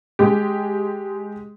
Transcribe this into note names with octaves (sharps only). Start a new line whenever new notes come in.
G#3 G4